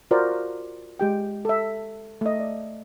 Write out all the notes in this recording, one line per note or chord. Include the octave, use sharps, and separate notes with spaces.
F4 F#4 A#4 C5 D5
G#3 G4 G5
A4 E5
A3 D#5
D5